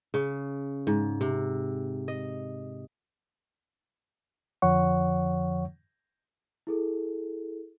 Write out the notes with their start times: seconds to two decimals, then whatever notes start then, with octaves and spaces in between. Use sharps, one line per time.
0.14 C#3
0.87 G#2
1.21 C3
2.08 D#5
4.62 F2 D3 F3 C#5 F#5 C#6
6.67 E4 G#4 A4